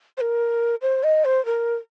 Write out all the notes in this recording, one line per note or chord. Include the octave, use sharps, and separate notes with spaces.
C5
A#4
C5
D#5
C5
A#4